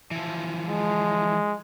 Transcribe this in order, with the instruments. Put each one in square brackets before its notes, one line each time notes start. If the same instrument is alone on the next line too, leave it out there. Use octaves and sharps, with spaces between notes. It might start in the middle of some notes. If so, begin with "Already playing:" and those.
[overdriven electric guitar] E3 F3
[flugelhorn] G#3